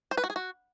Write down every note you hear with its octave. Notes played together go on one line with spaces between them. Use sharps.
C5
B4
F#4
G#4
F#4